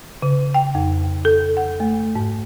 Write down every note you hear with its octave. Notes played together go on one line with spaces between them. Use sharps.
C#3
G5
F2
A4
F#5
A3
G#2